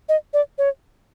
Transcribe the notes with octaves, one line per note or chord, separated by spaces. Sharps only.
D#5
D5
C#5